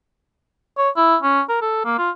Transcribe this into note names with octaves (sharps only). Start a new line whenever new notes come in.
C#5
E4
C#4
A#4
A4
A#3
F4